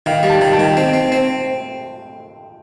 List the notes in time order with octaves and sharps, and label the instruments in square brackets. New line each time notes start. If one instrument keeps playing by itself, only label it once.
[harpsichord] D#3 [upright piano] F5 G5
[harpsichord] G3
[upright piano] G5 A5
[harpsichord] D#3
[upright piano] G5 A5
[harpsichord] D#3
C4
C4
C4